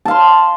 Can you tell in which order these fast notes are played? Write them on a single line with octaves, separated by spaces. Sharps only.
A5 F5 C6